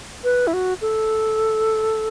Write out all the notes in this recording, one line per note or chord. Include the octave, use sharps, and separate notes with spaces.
B4
E4
F#4
A4